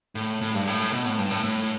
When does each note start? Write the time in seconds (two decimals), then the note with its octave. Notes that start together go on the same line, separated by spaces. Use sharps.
0.15 A2
0.41 A2
0.54 G2
0.67 A2
0.93 B2
1.05 A2
1.18 G2
1.31 A2
1.44 A2